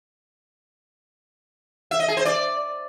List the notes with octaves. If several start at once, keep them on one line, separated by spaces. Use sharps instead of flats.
E5
D#5
G#4
C5
D5